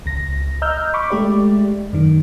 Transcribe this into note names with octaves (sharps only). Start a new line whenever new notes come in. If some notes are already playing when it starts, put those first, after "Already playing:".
C#2 A#6
D#5 A#5 E6 F6 G6
B5 C#6 D6
G#3 A3 G4 D5
F#2 D#3